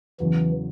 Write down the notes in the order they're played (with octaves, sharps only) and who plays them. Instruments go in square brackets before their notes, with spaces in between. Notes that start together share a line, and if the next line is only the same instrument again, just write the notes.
[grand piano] E2 C#3 F#3 [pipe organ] E3